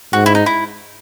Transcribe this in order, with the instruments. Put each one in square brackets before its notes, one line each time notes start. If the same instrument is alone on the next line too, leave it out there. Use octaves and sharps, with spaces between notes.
[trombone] G#2 [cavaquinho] F#4
[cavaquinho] E4
D#4
E4